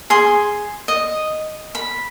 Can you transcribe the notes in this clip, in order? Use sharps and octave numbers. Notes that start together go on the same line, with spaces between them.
G#4 C6
D#5
B5